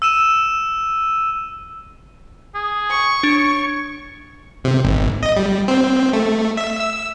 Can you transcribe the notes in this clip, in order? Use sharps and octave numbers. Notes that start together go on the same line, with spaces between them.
E6 D#7 E7
G#4
C#6
D4 C#5
C3
G#1
D#5
G3
C4
A3
E5
E6